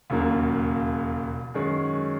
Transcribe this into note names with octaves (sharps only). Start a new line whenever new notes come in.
E1 D#2 C#3 F#3 A#3
F#2 D#3 G#3 C#4